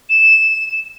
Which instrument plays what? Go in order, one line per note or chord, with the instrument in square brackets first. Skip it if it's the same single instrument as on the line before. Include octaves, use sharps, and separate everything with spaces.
[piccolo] E7